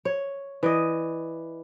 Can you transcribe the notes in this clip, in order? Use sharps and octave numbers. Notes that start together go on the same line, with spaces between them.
C#5
E3 D5 D#5